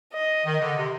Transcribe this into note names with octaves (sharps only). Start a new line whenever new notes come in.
D#5
D#3
D3
C3